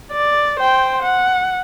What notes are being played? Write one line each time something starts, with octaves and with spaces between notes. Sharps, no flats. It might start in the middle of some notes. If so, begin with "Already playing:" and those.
D5
C5 G5
F#5